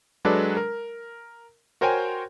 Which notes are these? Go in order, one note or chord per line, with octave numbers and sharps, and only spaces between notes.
F#3 G#3 D4 A4 B4 D5
A#4
F#4 A#4 C5 C#5 G5 G#5